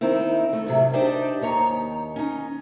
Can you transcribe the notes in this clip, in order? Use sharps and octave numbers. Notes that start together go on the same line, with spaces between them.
D#3 C4 D#4 E4
A3
A2 C3 F#3 G3
D4 D#4 G4 C5 D5
D#2 D#3 C#5 A#5
C#4 D#4